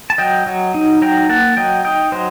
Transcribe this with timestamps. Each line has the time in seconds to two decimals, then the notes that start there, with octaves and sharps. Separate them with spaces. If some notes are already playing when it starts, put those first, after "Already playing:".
0.10 A5
0.18 F#3 D#5 G5
0.47 F#3
0.74 D#4
1.02 F#3 G5 A#5
1.29 A#3 F#5 A5
1.57 F#3 D#5 G5
1.85 D#4 D#5 G5
2.12 F#3 C5 D#5